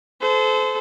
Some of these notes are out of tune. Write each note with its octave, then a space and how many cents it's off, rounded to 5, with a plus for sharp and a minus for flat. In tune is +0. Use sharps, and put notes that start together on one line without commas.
A4 -30 C5 -25